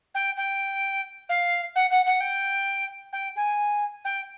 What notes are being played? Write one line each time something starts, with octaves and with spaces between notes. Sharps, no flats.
G5
G5
F5
F#5
F#5
F#5
G5
G5
G#5
G5